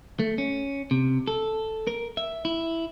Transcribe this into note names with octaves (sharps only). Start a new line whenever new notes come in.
A3
C#4
C3
A4
A#4
E5
E4